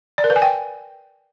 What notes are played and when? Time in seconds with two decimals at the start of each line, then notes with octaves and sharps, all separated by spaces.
0.18 D5
0.24 A#4
0.30 B4
0.36 G#5
0.42 G5